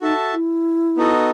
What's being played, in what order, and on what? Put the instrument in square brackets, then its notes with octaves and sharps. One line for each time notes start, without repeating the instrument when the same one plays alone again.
[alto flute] D#4 [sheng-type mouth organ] F#4 A4 E5 A5
[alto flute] E4
[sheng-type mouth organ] B3 D#4 F#4 A4 D#5